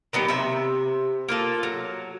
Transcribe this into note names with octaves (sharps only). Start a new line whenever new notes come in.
D#3 F#3 B3 G4
C3 E5
A#3 F4 A4
F#3